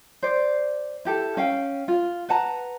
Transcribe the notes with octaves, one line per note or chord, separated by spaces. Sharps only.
C5 D5
E4 G4 A4
C#4 F5 G5
F4
B4 F#5 A5 A#5